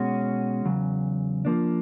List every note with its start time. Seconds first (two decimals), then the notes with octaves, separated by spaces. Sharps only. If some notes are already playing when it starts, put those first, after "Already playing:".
Already playing: B2 G#3 C#4 F#4
0.65 E2 C#3 F#3
1.45 F3 A#3 D4